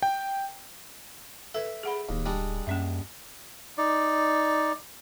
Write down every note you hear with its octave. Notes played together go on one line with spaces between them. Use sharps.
G5
A4 B4 E5
G#4 F#5 B5
D1 D#2
G3 G#3 D4
F#2 A#3 C#4 E5
D#4 D5